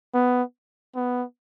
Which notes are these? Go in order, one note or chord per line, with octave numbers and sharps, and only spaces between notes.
B3
B3